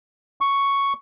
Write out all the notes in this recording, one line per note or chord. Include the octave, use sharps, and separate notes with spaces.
C#6